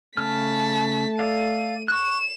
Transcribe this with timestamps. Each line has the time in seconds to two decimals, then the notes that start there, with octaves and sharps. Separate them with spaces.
0.17 C#3 A3 A5 F6 B6
1.19 A4 D5 F5 D#7
1.88 C#6 F#6 E7